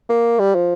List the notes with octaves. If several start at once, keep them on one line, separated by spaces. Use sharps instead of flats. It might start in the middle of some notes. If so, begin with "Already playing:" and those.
A#3
G3
F3